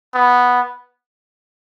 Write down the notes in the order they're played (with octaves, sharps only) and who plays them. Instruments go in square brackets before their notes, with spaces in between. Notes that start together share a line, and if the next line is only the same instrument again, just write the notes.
[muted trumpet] B3